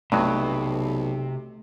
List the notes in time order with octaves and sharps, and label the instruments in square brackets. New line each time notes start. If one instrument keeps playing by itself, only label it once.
[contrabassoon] B1 [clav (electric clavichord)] G2 F#3 [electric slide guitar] C3 [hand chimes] A3